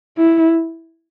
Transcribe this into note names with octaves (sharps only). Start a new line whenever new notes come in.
E4